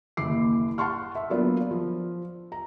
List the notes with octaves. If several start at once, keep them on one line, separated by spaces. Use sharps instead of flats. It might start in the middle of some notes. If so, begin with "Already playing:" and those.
F#1 D#2 E3 D6 C7
F#5 A5 C6 C#6 F6
E5
F#3 A#3 B3 D4 F4
F3
A#5